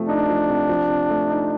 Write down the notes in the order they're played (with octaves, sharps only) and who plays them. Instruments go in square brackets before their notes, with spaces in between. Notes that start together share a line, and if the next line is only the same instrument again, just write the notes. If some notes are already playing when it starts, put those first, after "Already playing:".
Already playing: [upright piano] C3 F3 A3
[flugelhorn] D4 [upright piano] D#4
[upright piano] F3
C3
F3
C3
A3
D#4